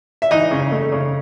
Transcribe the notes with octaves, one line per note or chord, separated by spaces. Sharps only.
E5
E3 D#4 D#5
C#3
A3
C#3